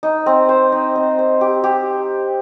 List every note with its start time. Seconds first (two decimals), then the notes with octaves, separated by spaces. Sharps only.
0.03 D#4
0.26 C4
0.49 C5
0.72 D#4
0.96 C4
1.19 C5
1.41 G4
1.64 G4